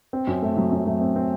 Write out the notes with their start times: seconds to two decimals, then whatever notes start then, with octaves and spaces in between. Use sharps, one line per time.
0.13 C4
0.27 F#2
0.42 A3
0.57 F#3
0.72 F#2
0.86 A3
1.01 C4
1.16 C4